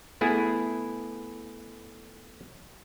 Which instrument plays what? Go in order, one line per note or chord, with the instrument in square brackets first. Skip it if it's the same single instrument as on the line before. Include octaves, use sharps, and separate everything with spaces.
[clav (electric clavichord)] A3 B3 E4 G#4